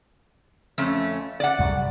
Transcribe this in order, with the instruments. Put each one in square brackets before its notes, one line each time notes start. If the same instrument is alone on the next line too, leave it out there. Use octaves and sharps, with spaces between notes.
[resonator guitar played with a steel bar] F2 A3 C#4
D5 F#5
[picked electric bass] C2 F#2 G3